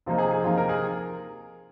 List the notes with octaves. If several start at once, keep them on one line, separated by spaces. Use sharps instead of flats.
C3 F3 A#3 D#4 F4
G#4
G#4
C3 F3 A#3 D#4 F4
A#4
G#4